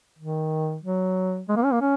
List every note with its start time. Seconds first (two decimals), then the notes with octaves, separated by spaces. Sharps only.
0.19 D#3
0.83 F#3
1.49 G#3
1.56 A#3
1.65 C#4
1.73 A#3
1.81 C#4